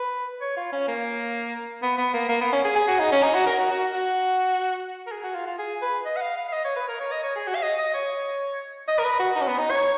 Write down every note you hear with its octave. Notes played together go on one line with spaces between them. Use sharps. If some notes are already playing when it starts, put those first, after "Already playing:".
Already playing: B4
C#5
F4
C#4
A#3
B3
B3
A#3
A#3
B3
C#4
G#4
G#4
F#4
D#4
C#4
D#4
F#4
A#4
F#4
F#4
F#4
A#4
G#4
F#4
F4
F4
G#4
B4
D#5
F#5
F5
F5
F5
D#5
C#5
B4
A#4
C#5
D#5
C#5
G#4
F#4
F5
D#5
D#5
C#5
D#5
A#4
B4
F#4
D#4
C#4
B3
D#4
C#5